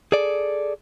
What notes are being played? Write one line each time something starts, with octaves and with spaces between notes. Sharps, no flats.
G#4 A4 D5